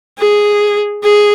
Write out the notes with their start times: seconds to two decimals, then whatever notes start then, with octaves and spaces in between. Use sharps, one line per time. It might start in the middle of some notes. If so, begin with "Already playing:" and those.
0.19 G#4
1.03 G#4